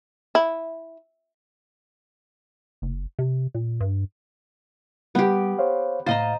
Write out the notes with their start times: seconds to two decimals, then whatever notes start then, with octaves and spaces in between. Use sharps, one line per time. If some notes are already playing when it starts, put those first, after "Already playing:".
0.35 E4
2.82 F#1
3.19 C3
3.54 A#2
3.80 G2
5.15 G3 B3 G4
5.59 C5 C#5 F5
6.06 A2 C5 D#5 F5 A#5 A6